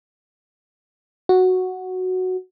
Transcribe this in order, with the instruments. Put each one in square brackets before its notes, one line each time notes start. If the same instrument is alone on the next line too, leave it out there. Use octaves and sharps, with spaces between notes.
[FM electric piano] F#4